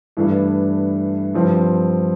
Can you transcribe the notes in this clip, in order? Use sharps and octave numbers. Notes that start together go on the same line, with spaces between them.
G2 E3 A3 D4
G2 F3 C4